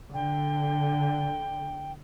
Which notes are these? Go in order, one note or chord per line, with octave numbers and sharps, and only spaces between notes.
D3 G5